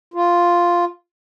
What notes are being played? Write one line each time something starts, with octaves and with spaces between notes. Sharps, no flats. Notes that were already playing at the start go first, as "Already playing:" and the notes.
F4